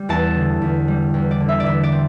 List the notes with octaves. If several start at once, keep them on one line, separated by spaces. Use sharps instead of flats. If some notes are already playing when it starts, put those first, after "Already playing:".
Already playing: G3
E2 A5
D3
E2
G3
E2
D5
D3
E5
D5
E2 E5
D5
C4